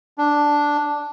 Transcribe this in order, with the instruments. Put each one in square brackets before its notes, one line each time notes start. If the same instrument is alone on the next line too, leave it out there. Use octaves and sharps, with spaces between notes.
[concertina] D4